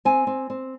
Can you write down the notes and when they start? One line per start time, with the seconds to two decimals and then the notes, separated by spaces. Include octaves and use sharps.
0.05 C4 G#5
0.27 C4
0.50 C4